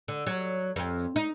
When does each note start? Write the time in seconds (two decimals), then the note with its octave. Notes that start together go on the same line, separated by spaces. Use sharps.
0.08 D3
0.27 F#3
0.76 F2
1.16 D#4